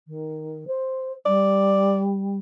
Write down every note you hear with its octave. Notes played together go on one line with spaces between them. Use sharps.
D#3
C5
G3 D5